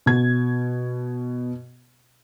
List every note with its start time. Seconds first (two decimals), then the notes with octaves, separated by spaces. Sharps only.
0.06 B2 G#6